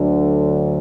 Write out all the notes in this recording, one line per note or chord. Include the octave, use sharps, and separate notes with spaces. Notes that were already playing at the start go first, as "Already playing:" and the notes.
Already playing: D2 D3 F#3